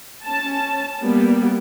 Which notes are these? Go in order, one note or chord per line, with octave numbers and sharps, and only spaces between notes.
C#4 A5
G3 A#3 B3